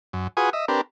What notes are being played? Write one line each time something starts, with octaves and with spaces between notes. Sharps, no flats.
F#2
F4 F#4 G#4 B4 G#5 D#6
D#5 E5
C4 D4 G4 A#4 B4